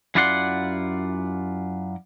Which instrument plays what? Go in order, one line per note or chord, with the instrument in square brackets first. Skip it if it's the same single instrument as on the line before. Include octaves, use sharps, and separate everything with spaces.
[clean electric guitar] F#2 E4 F4 D5 F#5 C6